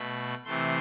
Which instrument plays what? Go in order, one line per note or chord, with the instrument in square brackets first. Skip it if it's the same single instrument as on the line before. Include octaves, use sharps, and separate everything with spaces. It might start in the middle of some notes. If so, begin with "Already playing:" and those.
Already playing: [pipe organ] B2 A3 B5
C3 E3 A3 C6